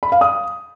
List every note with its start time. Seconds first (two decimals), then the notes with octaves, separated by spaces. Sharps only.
0.03 B5
0.12 F5
0.21 D#6